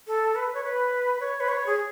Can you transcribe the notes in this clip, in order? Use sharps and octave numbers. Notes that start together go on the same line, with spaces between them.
A4
B4
C#5
B4
C#5
B4
C#5
G#4